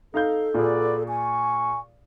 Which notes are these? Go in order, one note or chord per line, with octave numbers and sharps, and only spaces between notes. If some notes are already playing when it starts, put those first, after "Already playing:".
D#4 A4 F5 G6
A#2 F#4 G#4 B4 D5
G#5 C#6